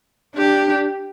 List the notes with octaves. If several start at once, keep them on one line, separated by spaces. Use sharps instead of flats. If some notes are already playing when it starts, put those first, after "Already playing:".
D4 G4